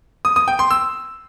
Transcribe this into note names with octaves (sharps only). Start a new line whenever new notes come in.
D#6
D#6
G5
C6
E6